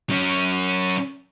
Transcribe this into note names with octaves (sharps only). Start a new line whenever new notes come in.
F#3 C#4